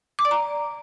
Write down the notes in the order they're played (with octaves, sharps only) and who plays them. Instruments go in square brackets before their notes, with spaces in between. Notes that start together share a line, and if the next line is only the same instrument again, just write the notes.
[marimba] D6
D5
A#5